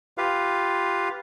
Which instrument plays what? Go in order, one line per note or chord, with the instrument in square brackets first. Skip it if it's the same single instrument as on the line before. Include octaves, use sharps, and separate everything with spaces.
[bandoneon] F4 G4 B4 F5